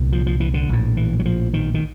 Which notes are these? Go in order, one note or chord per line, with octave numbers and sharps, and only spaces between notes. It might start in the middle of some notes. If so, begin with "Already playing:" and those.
Already playing: C2 A#2
F3
F3
E3
D3
A#1 A2
E3
F#3
F3
D#3
D#3